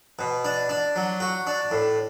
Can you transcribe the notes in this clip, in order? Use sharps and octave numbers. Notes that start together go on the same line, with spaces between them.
B2
D4
D4
F#3
F#4
D4
A2